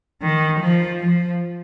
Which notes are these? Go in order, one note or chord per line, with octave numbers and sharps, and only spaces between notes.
D#3
F3
F3